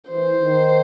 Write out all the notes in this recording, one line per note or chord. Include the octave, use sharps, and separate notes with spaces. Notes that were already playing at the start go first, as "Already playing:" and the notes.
E3 C5
D#3